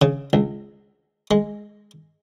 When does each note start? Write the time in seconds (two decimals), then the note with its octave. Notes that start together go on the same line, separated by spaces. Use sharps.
0.02 C#3
0.33 C#2
1.31 G#3